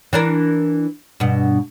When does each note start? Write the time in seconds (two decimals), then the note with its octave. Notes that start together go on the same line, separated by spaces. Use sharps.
0.13 E3 D4 A#4
1.20 G2 B2